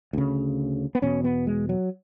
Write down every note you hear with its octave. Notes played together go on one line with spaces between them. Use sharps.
D2 C#3
B3
E2 B2 C#4
B3
G#3
F#3